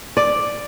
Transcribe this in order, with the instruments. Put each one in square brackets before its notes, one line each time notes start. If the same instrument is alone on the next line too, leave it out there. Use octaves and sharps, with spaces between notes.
[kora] D5